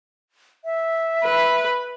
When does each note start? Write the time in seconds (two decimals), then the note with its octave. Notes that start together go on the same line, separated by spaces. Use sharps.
0.65 E5
1.24 B4